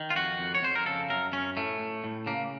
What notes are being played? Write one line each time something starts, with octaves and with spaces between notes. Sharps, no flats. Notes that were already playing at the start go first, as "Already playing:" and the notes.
Already playing: D#3
F4
F2 F#4
F2
C#5
F2 C5
A#4
C#3 A4
F#2 A#4
F#2 C#4
A2 A3
A2
A2
C#3 A#3